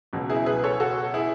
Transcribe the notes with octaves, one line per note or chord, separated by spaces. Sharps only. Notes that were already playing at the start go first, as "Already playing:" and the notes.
C#2 B2 F#3
E4 G#4
G#4 B4
A4 C#5
F#4 A4
E4 G#4